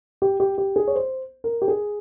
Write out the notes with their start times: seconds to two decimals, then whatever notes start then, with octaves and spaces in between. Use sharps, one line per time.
0.22 G4
0.40 G4
0.58 G4
0.76 G#4
0.88 C#5
0.95 C5
1.44 A#4
1.62 G4
1.68 G#4